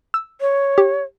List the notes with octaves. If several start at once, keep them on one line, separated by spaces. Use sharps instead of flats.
E6
C#5
G4